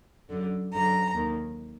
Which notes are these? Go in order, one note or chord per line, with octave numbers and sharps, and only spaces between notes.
F#2 D3
F#2 D3 A#5
D#2 D#3